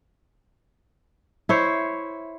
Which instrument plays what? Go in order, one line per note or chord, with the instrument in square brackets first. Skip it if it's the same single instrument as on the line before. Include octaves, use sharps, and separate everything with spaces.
[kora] E4 C5 C#5